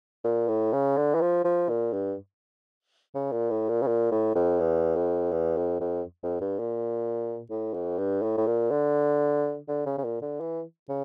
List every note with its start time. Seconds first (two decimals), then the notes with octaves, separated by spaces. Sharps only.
0.24 A#2
0.48 A2
0.73 C#3
0.97 D3
1.14 E3
1.21 F3
1.45 F3
1.69 A#2
1.93 G2
3.15 C#3
3.32 A#2
3.50 A2
3.69 A#2
3.82 C#3
3.87 A#2
4.11 A2
4.35 F2
4.60 E2
4.96 F2
5.32 E2
5.57 F2
5.80 F2
6.23 F2
6.41 G2
6.59 A#2
7.50 A2
7.74 F2
7.98 G2
8.23 A2
8.37 A2
8.47 A#2
8.71 D3
9.68 D3
9.86 C#3
9.98 C#3
10.04 A#2
10.22 D3
10.40 E3
10.89 C#3